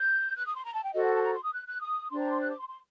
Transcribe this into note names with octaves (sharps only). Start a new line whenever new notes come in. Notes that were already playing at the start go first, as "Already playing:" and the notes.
Already playing: G6
F#6
D#6
C6
A#5
A5
G5
F#4 A4 C5 D#5
F#5
A5
A#5
C6
D#6
F#6
F#6
D#6
D4 G4 C5 C6
A#5
C6
F#6
D6
C6
C6